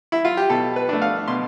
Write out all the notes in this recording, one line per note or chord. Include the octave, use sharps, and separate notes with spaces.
E4
F4
G4
B2 A4
B4
A3 D4
F5
B2 C6